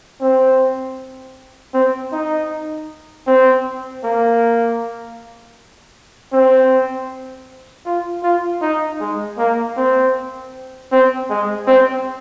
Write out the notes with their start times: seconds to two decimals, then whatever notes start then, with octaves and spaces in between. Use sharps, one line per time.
0.21 C4
1.74 C4
2.12 D#4
3.27 C4
4.04 A#3
6.33 C4
7.86 F4
8.23 F4
8.62 D#4
9.00 G#3
9.38 A#3
9.77 C4
10.92 C4
11.30 G#3
11.67 C4